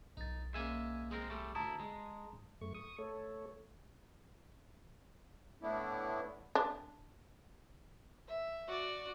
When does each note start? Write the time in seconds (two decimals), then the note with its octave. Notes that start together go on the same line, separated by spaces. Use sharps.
0.17 B1 D#4 A6
0.54 G#3 A#3 C#4 E5 G#5
1.11 G#3 C4 G#4 A#4
1.30 G3 A3
1.55 D2 E4 A5 A#5 D#6
1.80 G#3
2.61 F#2 A3 C#6
2.75 C#6 D#6
2.98 A3 A4 C#5
5.62 A2 A3 B3 D4 E4
6.55 D4
8.28 E5
8.68 F#4 D5